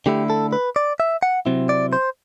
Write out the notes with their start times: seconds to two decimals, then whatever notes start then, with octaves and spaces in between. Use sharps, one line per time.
0.06 D3 A3 E4 G4
0.30 A4
0.53 B4
0.76 D5
1.00 E5
1.23 F#5
1.46 C3 F#3 C4 E4
1.69 D5
1.93 C5